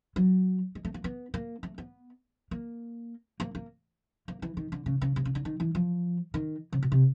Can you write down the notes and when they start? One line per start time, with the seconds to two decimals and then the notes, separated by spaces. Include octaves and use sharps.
0.16 F#3
0.75 G#3
0.85 A3
0.94 A#3
1.04 B3
1.34 A#3
1.63 A3
1.78 B3
2.51 A#3
3.40 A#3
3.55 A#3
4.28 A#3
4.42 E3
4.57 D#3
4.72 D3
4.86 C#3
5.01 C#3
5.16 C3
5.25 C#3
5.35 D3
5.45 D#3
5.60 E3
5.75 F3
6.34 D#3
6.72 C#3
6.83 B2
6.92 C3